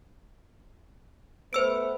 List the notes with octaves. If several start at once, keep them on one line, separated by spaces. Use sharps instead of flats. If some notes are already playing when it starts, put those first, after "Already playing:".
A3 B3 B4 C5 E6 D7